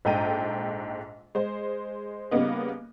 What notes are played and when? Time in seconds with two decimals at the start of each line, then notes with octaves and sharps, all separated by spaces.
0.05 A#1 G#2 A4 G5 A#5 D#7
1.35 G#3 C5
2.31 C#3 G3 A#3 B3 D#4